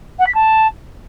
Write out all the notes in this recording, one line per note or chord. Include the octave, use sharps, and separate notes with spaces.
F#5
B6
A5